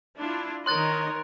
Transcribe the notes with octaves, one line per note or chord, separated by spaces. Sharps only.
D4 E4 F4
D#3 D#4 A#4 C#5 D#5 C6 F#6 A6